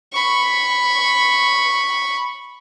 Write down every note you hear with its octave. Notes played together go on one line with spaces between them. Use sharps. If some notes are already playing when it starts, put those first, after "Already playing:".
B5 C#6